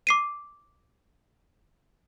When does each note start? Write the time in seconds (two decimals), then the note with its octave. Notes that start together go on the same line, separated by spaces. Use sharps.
0.07 D6 C7 D#7